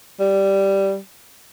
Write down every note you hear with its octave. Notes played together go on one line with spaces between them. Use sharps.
G3